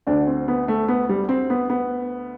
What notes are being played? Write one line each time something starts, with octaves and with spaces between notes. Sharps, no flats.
D2 D3 D4
C4
B3
A3
B3
G3
C4
B3
B3